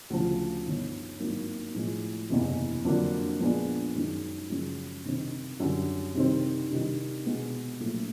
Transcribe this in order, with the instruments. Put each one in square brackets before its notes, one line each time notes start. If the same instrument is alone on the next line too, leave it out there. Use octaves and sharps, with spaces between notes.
[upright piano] D2 C#3 F3
G1 G2 D#3
G#1 G2 D#3 F#3 A#3
A2 F3 G#3
F#1 E2 C3 E3
F2 D3 F#3 A#3 D4
A#2 F3 G#3 B3 D4
F#2 D#3 G#3
F#2 C#3 F3 G#3
C3 D#3 G3 C4 D#4
F#2 D3 G3
C3 D#3 G3 C4
C3 D#3 G3
B2 G#3 B3
A#1 A#2 F#3 A3